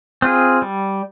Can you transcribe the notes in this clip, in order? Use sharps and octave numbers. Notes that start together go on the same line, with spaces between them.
C4 F4 G#4
G3